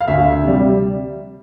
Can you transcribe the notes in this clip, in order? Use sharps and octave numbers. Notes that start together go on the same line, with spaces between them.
F5
D2 E5
C3 G3